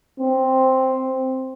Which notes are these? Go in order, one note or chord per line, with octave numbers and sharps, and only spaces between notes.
C4